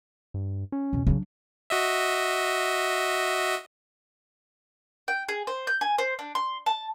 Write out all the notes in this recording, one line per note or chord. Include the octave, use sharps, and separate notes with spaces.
G2
C#4
E2 B2
C#3 F#3 D4
F#4 D#5 E5
G5
G#4
C5
G6
G#5
C5
D4
C6
A5